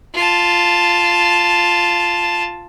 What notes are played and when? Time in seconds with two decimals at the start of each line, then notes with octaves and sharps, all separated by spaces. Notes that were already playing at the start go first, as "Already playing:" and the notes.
0.14 F4 A5